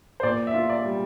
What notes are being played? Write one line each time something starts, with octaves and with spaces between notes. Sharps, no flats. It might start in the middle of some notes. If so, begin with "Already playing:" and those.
C5
A#2 D5
E5
F4
D5
G3